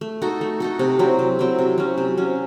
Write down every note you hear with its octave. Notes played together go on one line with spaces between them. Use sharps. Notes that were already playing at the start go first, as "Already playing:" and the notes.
A3
D#4 F#4 A4
A3
D#4 F#4 A4
C3
F#3 C4 E4
C3
F#3 C4 E4
C3
F#3 C#4
C3
F#3 C#4